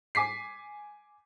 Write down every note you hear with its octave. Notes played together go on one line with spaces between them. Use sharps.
G#5 D6 B6 C7